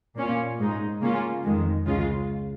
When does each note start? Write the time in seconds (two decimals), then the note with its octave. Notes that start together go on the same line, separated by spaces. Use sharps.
0.16 A#2 A#3 C#4 F4
0.58 G#2 G#3 D#4
1.01 C#3 A#3 C#4 F4
1.43 F2 D#3 G#3
1.86 C#2 C#3 G#3 F4